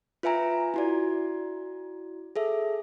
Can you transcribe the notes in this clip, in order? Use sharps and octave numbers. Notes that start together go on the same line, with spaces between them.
F4 B4 E5 G#5 A#5
E4 F#4 D5
G#4 A4 E5